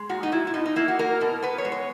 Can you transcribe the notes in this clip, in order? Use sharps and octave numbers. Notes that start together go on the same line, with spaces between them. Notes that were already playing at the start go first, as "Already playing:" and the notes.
Already playing: G#3
A#2 F#4
D#4
A#2 E4
E4
B2 D#4
D#4
A#3 E4
F#4
A#3 A#4
B2 A#4
B3 B4
C#5
G#3
C#5